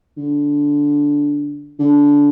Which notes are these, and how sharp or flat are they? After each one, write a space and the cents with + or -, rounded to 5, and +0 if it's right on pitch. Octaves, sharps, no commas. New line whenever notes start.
D3 -10
D3 -20